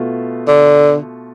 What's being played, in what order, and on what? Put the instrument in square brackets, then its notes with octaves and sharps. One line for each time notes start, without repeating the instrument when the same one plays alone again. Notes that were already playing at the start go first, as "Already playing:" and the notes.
Already playing: [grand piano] B2 A3 F4
[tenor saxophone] D3